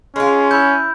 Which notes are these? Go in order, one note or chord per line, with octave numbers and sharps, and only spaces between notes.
G#3 C#4 F4
E4 B5 G6